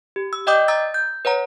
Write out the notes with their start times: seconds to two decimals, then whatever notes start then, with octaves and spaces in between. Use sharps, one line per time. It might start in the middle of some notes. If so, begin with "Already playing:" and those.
0.16 G4
0.33 E6
0.47 D5 D#5 G5 D6 D#6 G6
0.68 A#5 D#6 E6 A6
0.94 G6
1.25 B4 C#5 F#5 A#5